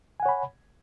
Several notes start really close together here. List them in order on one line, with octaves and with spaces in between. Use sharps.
G#5 F#5 C#5 B5